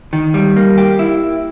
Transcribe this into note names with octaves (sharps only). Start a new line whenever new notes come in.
D#3
G3
A#3
G4
E4